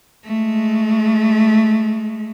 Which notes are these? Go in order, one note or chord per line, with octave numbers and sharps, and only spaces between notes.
G#3 A3